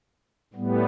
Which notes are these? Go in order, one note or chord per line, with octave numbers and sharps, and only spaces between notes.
A2 G3 B3